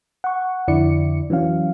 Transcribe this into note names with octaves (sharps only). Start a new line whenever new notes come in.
F#5 C#6
F2 D3 E4 D5 C#7
E3 F#3 C#4 F5